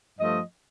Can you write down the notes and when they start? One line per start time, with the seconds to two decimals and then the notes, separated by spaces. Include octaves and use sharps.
0.19 G2 F3 A3 D#5